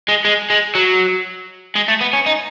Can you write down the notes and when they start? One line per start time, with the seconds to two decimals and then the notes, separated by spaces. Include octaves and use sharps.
0.08 G#3
0.25 G#3
0.50 G#3
0.75 F#3
1.75 G#3
1.88 A3
2.01 B3
2.13 C#4
2.26 D#4